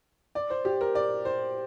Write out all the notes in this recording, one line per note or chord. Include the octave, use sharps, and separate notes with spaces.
D5
C5
G4
A#4
D5
C5